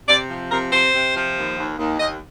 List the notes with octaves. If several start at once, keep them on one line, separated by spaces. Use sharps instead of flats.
C3 D5
F3
C3 A#4
C3 C5
C3
F3
D#2
D#2
D#2
D#2 D#5